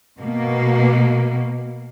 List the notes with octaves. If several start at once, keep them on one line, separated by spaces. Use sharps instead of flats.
B2 A#3